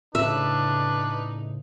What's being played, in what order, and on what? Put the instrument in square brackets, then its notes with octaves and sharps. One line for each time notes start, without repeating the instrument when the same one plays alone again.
[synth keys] A2 C#3 [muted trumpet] D4 [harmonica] D#4 B4 [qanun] E5